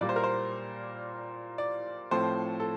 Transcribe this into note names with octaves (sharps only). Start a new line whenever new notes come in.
A#2 G3 A#3 D5
C5
A#4
C5
D5
A2 F3 A3 C4 C5
A4